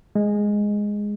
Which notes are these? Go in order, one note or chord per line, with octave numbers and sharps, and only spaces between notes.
G#3